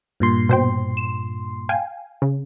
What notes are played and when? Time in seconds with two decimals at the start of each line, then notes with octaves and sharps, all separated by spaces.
0.20 G2 A#2 C6
0.49 B2 C5 G5
0.97 E7
1.69 F5 G5 G#5
2.22 C#3